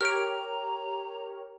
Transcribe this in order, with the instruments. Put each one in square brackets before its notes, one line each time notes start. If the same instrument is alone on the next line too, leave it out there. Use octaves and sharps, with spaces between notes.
[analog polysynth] G4 A#4 C#5 [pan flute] A#5 [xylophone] F6 D7